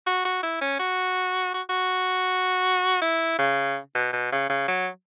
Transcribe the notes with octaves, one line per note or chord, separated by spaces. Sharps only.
F#4
F#4
E4
C#4
F#4
F#4
F#4
E4
C#3
B2
B2
C#3
C#3
F#3